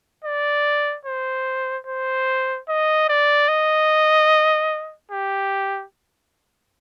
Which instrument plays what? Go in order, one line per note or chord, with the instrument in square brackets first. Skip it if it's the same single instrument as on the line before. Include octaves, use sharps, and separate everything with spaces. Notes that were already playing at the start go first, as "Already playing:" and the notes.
[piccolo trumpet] D5
C5
C5
D#5
D5
D#5
G4